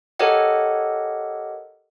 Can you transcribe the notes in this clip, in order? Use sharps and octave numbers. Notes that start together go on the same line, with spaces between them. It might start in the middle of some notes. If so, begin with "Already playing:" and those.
G4 A4 A#4 C#5 D#5 F#5